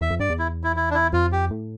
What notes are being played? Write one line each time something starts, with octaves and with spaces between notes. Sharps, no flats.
E2 E5
F2
G2 D5
E2
E4
E4
E4
D4
E4
F2 F4
G4
A2